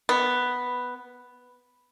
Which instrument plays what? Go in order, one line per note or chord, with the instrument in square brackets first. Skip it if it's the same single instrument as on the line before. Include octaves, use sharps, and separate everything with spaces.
[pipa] B3